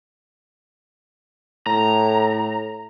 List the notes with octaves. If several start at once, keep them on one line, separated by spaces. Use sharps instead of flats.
A2 A#5